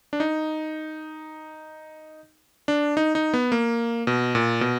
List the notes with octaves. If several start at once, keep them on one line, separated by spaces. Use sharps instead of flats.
D4
D#4
D4
D#4
D#4
B3
A#3
B2
A#2
B2